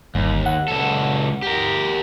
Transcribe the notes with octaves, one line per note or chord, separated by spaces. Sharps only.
G1 D#2
F#5
C#2 A4
G4 A#4